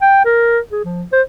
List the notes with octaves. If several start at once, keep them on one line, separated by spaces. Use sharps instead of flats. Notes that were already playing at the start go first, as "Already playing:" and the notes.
G5
A#4
G#4
F3
C5